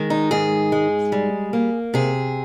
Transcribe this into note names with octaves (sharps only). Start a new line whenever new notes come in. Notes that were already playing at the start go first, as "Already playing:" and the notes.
Already playing: D#3 G#3
D#4
G#2 G#4
G#3
G3
A#3
C3 G#4